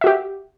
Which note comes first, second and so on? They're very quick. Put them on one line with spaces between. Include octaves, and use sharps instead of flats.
E5 F#4 G4